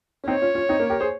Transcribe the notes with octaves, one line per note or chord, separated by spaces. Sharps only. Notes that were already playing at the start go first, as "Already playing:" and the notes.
C#4
C4 D#4 C#5
C#4 F4
C#4 F4
C4 D#4
A#3 C#4
G4 A#4
G#4 C5